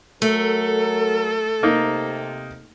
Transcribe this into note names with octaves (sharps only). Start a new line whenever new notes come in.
F#3 A3 A4 A#4
C3 A#3 D#4